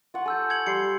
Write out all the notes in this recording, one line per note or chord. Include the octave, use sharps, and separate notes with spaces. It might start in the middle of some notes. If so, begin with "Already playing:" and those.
F4 F#5 C#6
A4 G#5 E6 G6
G#6 C#7 F#7
G3 C6 C7 C#7
G#6